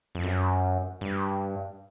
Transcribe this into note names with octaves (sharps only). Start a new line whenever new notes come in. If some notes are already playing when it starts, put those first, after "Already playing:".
F2
F#2
G2